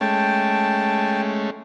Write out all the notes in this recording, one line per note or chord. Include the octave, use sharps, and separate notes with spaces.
G#3 A3 C#4 G5 A5